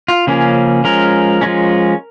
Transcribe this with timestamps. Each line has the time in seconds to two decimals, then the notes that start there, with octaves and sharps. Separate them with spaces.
0.08 F4
0.27 C#3 F3 A#3 C#4 G#4
0.84 F3 G#3 C#4 A#4
1.41 F3 G#3 C#4